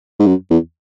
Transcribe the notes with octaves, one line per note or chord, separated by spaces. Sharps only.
G#2
F#2
E2